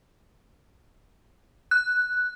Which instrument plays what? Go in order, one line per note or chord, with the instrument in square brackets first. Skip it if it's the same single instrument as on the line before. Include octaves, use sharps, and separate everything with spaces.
[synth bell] F#6